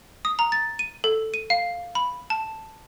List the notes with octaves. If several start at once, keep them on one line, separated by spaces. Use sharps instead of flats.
D#6
A#5
A6
D#7
A4
D#7
F5
B5
A5